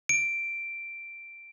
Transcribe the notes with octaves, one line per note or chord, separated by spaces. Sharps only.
D7